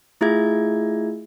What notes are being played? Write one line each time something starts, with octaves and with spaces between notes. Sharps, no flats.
A3 E4 F4 G#4 E5 G#6